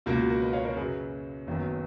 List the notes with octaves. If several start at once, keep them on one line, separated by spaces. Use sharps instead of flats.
C#2 B2 A#3 F4
F#4
F#4 A#4
B4 D#5
C#5 F5
A#4 C#5
F#2 C#3 F#3 G#4 B4
F#1 F#2 D#3 F#3 B3